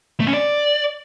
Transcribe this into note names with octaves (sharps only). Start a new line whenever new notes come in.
A3
C#4
D5